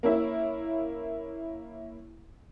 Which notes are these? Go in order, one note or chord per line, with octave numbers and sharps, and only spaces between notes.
A#3 C#4 E4